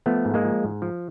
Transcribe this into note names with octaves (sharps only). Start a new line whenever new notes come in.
F3 A3 B3
G#2
G#3 A#3
F3
G#2
F3